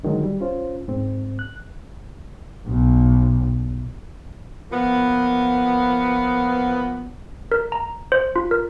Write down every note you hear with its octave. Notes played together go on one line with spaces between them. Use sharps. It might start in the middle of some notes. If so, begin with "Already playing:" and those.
D3 D#3 F#3 G#3
G3
C#4 F4 C5
G#2 C4
F#6
B1
F3 A#3 B3
A#4
A#5
C5
F4
A#4